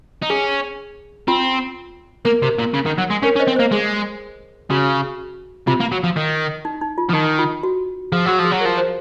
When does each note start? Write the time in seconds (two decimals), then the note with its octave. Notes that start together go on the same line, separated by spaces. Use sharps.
0.22 D#4
0.30 C#4 G#4
1.28 C4 F4
2.25 A#3 A#4
2.42 C3
2.59 A#2
2.74 C#3
2.86 D#3
2.98 F#3
3.11 G#3
3.23 C#4 A#4 C#5
3.36 C#4
3.39 C5 D#5
3.48 C4
3.56 A#3 C5 D#5
3.72 G#3 G#4
4.70 C#3 F#4
5.67 C3 F4
5.80 A#3
5.92 F#3
6.04 F3
6.17 D#3
6.65 D#4
6.81 D#4
6.98 F4
7.10 F3
7.14 D#3 D#4
7.39 F4
7.63 F#4
8.12 F3 G#4
8.26 F#3 F#4
8.39 F3
8.45 G#4
8.51 F#3
8.60 F3 A#4
8.78 C5